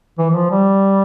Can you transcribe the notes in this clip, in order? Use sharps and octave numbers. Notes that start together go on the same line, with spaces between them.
E3
E3
F3
G3